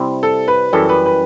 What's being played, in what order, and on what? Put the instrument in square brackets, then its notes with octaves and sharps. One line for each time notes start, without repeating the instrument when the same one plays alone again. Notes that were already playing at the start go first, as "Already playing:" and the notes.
Already playing: [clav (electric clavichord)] C3 G3 C4 E4
[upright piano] A4
B4
[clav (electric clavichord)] F#2 E3 G3 [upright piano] A4
[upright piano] B4
B4